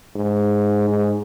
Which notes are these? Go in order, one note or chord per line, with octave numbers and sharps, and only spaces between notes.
G#2
G#2